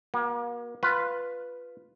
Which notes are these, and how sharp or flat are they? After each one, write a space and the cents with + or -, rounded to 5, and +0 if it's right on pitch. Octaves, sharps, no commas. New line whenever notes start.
A#3 +35 F#4 +0
F4 +0 B4 +0